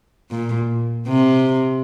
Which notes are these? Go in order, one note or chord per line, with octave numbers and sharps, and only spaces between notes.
A#2
C3